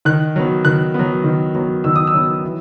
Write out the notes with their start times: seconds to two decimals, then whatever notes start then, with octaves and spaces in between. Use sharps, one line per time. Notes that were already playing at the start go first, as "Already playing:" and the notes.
0.05 D#3 F#6
0.36 F#3 B3
0.65 D#3 F#6
0.94 F#3 B3
1.24 D#3
1.55 F#3 B3
1.84 D#3 E6
1.96 D#6
2.07 E6
2.14 F#3 B3
2.44 E3